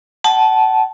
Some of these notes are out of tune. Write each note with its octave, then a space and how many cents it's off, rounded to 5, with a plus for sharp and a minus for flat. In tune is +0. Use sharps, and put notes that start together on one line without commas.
F#5 +30 A5 -15